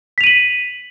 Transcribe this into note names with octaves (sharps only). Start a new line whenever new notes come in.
B6 D#7 F7 F#7